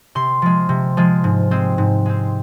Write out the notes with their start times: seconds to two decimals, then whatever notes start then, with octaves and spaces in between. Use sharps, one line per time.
0.15 C3 C6
0.42 F3 G#3
0.69 C3
0.97 F3 G#3
1.24 G#2
1.51 G#3 C4
1.78 G#2
2.06 G#3 C4